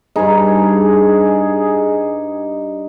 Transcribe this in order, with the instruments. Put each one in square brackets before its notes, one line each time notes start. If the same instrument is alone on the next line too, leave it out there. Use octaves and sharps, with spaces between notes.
[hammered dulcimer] G2 D#4 [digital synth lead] G#4